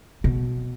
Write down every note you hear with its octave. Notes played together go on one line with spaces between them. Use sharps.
B2